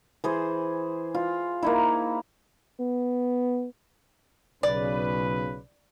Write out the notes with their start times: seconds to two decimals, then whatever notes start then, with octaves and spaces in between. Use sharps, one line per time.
0.24 E3 G#4 C5
1.15 F4
1.63 A#3 D#4 E4
2.80 B3
4.63 B1 C#3 B4 D5